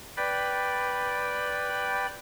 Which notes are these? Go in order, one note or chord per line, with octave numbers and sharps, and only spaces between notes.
B4 D5 G5 B5